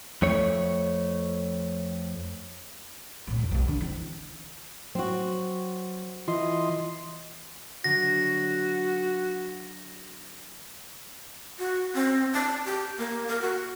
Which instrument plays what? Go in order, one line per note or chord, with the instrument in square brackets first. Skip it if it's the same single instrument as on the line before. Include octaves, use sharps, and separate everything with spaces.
[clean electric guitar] F2 A3 C#5
[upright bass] A2 B3
C2 F2
B1 A#3
D3 D4
E3 C4
[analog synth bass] F#3 [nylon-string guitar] C4 F#4
[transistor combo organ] E3 D#5 C6 [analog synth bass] F4
[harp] D3 F#3 [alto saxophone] F#4 [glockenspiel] A#6
[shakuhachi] F#4
C4
A5
G4
A#3
A#4
F#4